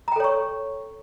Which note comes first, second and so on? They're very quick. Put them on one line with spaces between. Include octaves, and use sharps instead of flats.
A#5 G5 A4 C#5 C#6